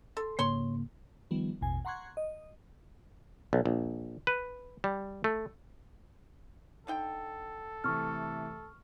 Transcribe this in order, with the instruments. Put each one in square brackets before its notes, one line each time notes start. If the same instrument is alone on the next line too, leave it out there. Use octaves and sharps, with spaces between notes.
[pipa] A4 [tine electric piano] C6
[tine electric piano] G#2 C#3 A#3 [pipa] C#5 C6
[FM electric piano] D#3 F3 G3 B3
A1 E2 B2 G#5
F#5 A#5 C6 C#6 F#6 G#6
D#5
[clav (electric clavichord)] B1
A#1
B4
G3
A3
[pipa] D3 D#4 G5 [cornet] A4
[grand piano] C3 E3 A3 [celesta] C#6 F6